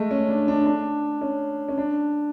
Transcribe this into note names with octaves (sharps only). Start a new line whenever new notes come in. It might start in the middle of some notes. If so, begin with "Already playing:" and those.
Already playing: G#3 A3
C#4
D4
D4
D4
C#4
C#4
D4